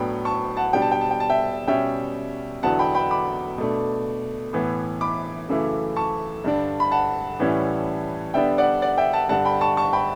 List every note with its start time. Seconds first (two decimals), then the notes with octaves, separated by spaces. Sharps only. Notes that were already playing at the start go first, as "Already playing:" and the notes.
Already playing: A2 F#3 B3 D4 G5 B5
0.25 A5 C#6
0.57 F#5 A5
0.73 B2 G3 D4 G5
0.82 A5
0.92 G5
1.01 A5
1.11 G5
1.20 A5
1.30 E5 G5
1.67 B2 G3 C#4 E5 G5
2.63 E2 D3 F#3 B3 E4 F#5 A5
2.79 G5 B5
2.95 G5 B5
3.11 B5 D6
3.58 B2 A3 D4
4.53 A2 E3 B3
5.01 B5 D6
5.49 F#2 C#3 E3 A3 E4
5.96 A5 C#6
6.44 G2 D3 G3 D4
6.80 B5
6.91 F#5 A5
7.39 A2 E3 G3 C#4 E4
8.34 D3 G3 B3 D4 E5 G5
8.58 D5 F#5
8.82 D5 F#5
8.98 E5 G5
9.13 F#5 A5
9.29 G2 D3 G3 D4 F#5 A5
9.45 G5 B5
9.61 A5 C#6
9.77 A5 C#6
9.93 G5 B5